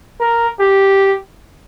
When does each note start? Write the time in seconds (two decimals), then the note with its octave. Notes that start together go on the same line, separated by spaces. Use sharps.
0.21 A#4
0.60 G4